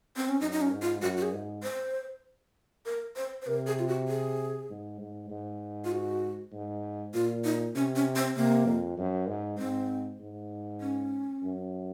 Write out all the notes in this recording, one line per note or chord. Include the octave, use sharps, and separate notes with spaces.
C4
C#4
F#2 D#4
D#4
C#4
G#2
F4
F#2 F#4
F#4
G#4
G#2
C5
A#4
C5
C5
C3 A#4
G#4
F4
F#4
G#4
G#2
G#2
G#2
F4
F#4
G#2
A#2 F4
D#4
C3 C#4
C#4
C4
C3 A#3
F2
F#2
G#2
G#2 C4
G#2
C#4
F#2